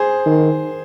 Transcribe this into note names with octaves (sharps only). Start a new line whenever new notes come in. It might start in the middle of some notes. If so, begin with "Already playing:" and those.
Already playing: G#4 C5
D#3